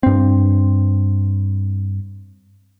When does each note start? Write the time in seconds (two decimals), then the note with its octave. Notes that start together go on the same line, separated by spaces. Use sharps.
0.03 G2 C4